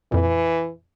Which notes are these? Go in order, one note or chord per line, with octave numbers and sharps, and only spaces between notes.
F2 A#2 E3